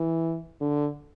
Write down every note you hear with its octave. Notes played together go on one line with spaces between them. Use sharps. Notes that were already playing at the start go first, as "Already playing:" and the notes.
Already playing: E3
D3